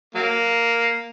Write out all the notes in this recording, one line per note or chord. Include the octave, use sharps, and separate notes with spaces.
F#3 A#3